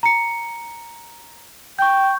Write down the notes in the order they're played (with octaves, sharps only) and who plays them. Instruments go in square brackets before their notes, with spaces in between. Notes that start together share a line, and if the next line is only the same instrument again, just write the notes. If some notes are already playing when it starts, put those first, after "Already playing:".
[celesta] A#5 C#7
[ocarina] G5 [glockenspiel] C#6 G6